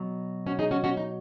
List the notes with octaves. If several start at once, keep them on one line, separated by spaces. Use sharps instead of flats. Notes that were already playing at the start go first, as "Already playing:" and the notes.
Already playing: B2 F#3
C#4 F#4
D#4 G#4
C#4 F#4
C#4 F#4
D#4